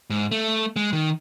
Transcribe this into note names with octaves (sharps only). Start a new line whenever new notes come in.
G#2
A3
G#3
D#3